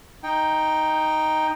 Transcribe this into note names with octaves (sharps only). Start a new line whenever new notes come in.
D#4 G5